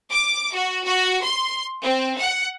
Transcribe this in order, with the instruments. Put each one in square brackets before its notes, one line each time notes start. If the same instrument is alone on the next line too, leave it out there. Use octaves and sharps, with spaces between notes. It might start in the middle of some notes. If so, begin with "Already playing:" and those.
[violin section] D6
F#4
F#4
C6
C4
F#5